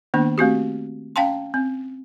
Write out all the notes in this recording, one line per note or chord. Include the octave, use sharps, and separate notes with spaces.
D#3 A#3 B3 D4
A3 C4 F#4 G4
C#4 F5 G5 A5 C6
C4